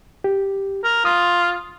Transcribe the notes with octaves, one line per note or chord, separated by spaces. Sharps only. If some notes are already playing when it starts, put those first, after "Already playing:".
G4
A#4
F4 D#6